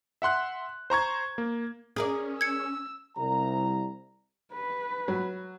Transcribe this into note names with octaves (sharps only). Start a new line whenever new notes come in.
E5 F#5 C6 F#6
C5 A#5 C#6 G#6
A#3
C#4 G#4 A#4 D5
E6 G#6 C#7
C2 A#5
B4
F#3